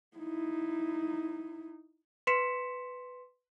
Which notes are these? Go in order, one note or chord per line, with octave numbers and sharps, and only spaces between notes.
D#4 E4
B4 C6 B6 C#7 E7